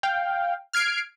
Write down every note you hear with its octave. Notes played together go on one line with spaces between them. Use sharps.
F5 G5
F6 G#6 C7 D7